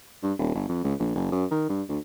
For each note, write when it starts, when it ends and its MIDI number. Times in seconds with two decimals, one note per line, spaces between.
0.23 0.33 43
0.39 0.51 27
0.55 0.66 31
0.69 0.81 41
0.84 0.94 37
0.99 1.13 34
1.15 1.31 30
1.32 1.45 42
1.51 1.67 51
1.69 1.82 43
1.89 1.99 38